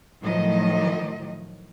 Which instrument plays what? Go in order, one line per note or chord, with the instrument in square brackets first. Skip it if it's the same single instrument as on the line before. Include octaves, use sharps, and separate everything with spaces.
[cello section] A2 D#3 F3 F#3 D#5